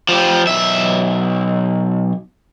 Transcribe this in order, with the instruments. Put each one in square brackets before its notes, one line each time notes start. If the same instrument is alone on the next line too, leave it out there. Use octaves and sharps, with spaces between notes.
[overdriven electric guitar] F3 G4
B1 E5